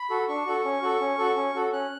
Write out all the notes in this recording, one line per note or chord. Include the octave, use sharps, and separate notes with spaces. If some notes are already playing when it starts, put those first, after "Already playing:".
Already playing: B5
F#4 A4
D4 C#6
F#4 A4
C#4
F#4 A4
C#4
F#4 A4
C#4
F#4 A4
C#4 F#6